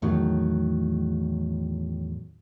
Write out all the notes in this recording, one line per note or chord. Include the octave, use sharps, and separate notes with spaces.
E2 A2 D#3 F#3